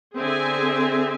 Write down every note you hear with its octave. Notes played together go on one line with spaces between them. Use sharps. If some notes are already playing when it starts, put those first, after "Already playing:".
D3 C4 G#4 E5 G#5